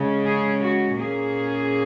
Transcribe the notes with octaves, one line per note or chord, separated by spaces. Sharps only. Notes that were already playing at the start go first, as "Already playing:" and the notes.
Already playing: C#3 G#3 C#4
G#4
F#4
A#2 A#3 C#4 G#4